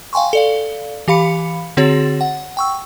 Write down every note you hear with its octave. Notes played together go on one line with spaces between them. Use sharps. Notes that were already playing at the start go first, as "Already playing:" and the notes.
F5 G5 G#5 C6 C#6
A4 D5 F5
E3 G4 F5 B5 C#7
D3 C4 F#4 G#4 C#5 A6
F#5
G5 C#6 E6